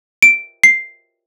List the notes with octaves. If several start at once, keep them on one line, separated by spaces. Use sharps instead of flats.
D7
C7